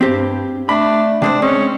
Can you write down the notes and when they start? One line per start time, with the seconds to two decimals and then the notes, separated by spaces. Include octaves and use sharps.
0.01 G2 C4 G4
0.69 A3 D4 B5
1.22 C3 G#3 D4 C5
1.42 G#3 C4 C#4